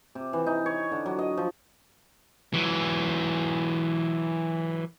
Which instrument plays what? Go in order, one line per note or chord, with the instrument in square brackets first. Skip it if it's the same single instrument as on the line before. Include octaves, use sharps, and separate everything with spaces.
[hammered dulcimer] C3
E3
D#4
C#5
D3
F#3
D#5
F3
[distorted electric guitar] E3 F#3